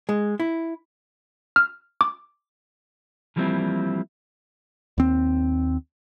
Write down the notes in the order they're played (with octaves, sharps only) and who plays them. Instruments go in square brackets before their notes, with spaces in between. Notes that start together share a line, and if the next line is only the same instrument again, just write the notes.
[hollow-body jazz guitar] G#3
E4
[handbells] F6
D6
[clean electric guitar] E3 F3 G3 A#3 C4 E4
[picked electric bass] D#2 C4